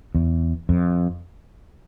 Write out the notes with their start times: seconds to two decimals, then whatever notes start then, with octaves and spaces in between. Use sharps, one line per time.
0.15 E2
0.69 F2